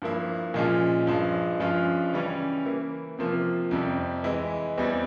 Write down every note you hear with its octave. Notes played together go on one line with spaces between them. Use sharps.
G2 F3 A#3 E4
A#2 F3 G#3 C#4 F4
G2 F3 G#3
G2 F3 G#3 C#4 F4
C#3 E3 G3 C#4
E3 A#3 E4
C3 F3 A#3 F4
F2 C3 G3 C4
E3 G#3 E4
E2 E3 G3 C4